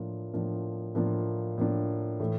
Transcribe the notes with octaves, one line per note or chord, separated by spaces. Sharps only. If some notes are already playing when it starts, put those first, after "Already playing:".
Already playing: A2 F3 A#3 D4 F4
A2 F3 A#3 D4 F4
A2 F3 A#3 D4 F4
A2 F3 A#3 D4 F4
A2 E3 A3